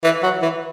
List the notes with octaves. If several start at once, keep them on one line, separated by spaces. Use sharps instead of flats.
E3
F#3
E3